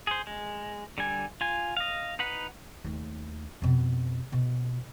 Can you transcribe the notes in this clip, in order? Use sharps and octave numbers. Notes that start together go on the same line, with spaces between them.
G#4 C5
G#3
D3 G3 G#5
F4 G#5
D#5 F5
D#4 B4 F#5 B5
D#2 A3
F2 B2
B2